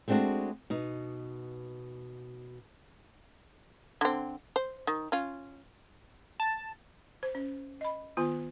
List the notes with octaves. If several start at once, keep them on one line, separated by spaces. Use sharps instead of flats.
G#3 A3 C4 D4 F#4
B2 D#4
D3 C4
C5
D#3
C#4 F4
A5
C5
C#4
D#5 B5
D#3 B3 F4